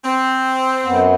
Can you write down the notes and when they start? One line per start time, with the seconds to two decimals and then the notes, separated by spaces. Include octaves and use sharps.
0.05 C4
0.85 F#2 B3